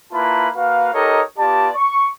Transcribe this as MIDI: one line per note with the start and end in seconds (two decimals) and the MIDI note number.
0.13 0.48 58
0.13 0.48 64
0.13 0.48 65
0.13 0.48 71
0.13 0.48 81
0.13 0.48 83
0.55 0.90 58
0.55 0.90 66
0.55 0.90 71
0.55 0.90 77
0.93 1.21 63
0.93 1.21 67
0.93 1.21 69
0.93 1.21 70
0.93 1.21 73
0.93 1.21 75
1.38 1.69 59
1.38 1.69 65
1.38 1.69 67
1.38 1.69 74
1.38 1.69 81
1.75 2.09 85